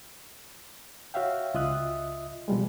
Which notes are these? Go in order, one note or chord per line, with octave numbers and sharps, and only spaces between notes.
F#4 C#5 E5 F5 G5
C#2 F4 D#5 E5 D#6 F#6
B2 F3 G3 G#3